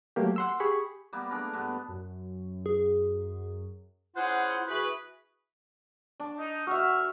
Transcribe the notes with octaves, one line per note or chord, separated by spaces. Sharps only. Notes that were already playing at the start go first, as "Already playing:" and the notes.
F#3 A3 A#3 G4
F#5 C6 E6
G4 G#4 B5 C#6
G3 A#3 B3
A3 D4 G#4 A#4
G2 B3
F#2
G#4
C#4 E4 F4 G#4 C5 F#5
E3 F#4 G#4 B4
D4
D#4
D2 F#4 E5 F6